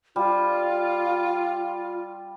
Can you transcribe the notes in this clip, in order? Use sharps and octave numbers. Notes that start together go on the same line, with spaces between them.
G3 F4